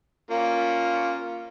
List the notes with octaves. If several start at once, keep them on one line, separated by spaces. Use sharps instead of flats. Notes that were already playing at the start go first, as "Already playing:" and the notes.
A#3 C#4 F4